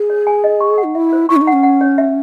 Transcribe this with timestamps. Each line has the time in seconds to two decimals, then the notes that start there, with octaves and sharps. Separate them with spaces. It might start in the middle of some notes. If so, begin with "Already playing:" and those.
Already playing: G#4
0.10 C#5
0.27 G#5
0.44 D#5
0.61 C#6
0.78 F#5
0.84 D#4
0.95 E4 E5
1.13 C5
1.29 E4 C#6
1.36 C#4
1.41 D#4
1.47 F#5
1.52 C#4
1.63 F#5
1.81 C#5
1.98 E5